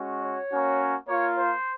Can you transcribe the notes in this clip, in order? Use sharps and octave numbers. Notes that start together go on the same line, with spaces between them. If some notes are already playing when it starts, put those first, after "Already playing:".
Already playing: G#3 C#4 F#4
C#5
A#3 C#4 F#4
A#3 F4 C#5
C5